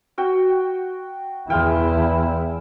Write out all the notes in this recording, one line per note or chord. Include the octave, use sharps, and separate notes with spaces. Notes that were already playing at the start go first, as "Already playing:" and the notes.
F#4 G5
E2 G#3 E4 F5 G5